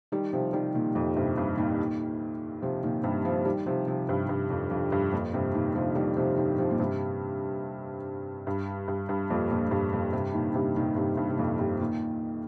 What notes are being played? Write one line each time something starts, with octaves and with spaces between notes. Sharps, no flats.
D#3 G3
C3 F3
D#3 G3
A#2 D#3
F2 A#2
G2 C3
G2 C3
A#2 D#3
C3 F3
A#2 D#3
G2 C3
C3 F3
D#3 G3
C3 F3
C3 F3
G2 C3
G2
F2
F2
G2
F2 A#2
G2 C3
A#2 D#3
C3 F3
D#3 G3
C3 F3
D#3 G3
C3 F3
A#2
G2 C3
G2
G2
G2
F2 A#2
F2 A#2
A#2
G2
F2 A#2
G2 C3
A#2 D#3
G2 C3
A#2 D#3
G2 C3
G2
C3
F2 A#2
G2 C3
A#2 D#3